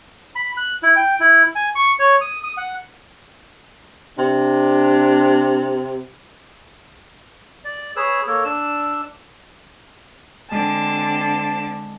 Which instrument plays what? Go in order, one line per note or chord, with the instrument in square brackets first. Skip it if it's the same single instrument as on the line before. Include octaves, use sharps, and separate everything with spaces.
[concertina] B5
F#6
E4
G5
E4
G#5
C#6
C#5
D#6
D#6
F#5
[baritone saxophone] C3 [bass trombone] D4
[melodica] D5
G#4 B4 C#5 E6
A#3 A4 C#5
D4 E6
[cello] D3 C4 [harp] G#3 [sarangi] A5